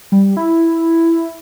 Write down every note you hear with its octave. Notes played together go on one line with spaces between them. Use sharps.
G3
E4